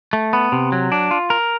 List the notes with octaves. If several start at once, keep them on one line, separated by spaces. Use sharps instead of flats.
A3
B3
C3
F#3
D4
F4
A#4